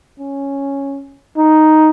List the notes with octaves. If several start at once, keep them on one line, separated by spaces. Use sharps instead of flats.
C#4
D#4